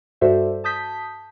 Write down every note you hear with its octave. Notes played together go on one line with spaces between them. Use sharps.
G2 F#4 A4 C5 D5 E5
A5 D#6 G6 B6